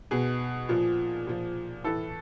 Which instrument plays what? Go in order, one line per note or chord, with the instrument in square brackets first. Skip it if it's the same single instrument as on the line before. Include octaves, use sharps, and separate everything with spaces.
[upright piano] B2 G#4
A#2 F3
A#2 F3
A2 E3 A4